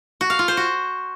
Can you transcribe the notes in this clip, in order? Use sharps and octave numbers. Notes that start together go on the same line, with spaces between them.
F#4
F5
F4
C5
F#4